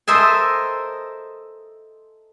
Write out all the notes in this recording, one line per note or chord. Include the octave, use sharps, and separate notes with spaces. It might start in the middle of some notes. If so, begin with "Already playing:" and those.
A4 A#4 C5 D#5 E5 G#5